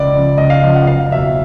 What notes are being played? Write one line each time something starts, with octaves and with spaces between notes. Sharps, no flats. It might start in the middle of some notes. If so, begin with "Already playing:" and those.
Already playing: C#2 D5
C#3 F3
C#2 D#5
F5
C#3 F3
F#5
F#1 F5
E2 B2 F#3 E5